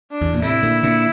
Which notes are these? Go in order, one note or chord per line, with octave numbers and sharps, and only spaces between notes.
D4
E2
A#2
A2 C3 E4
A#2 D3
A#2 D3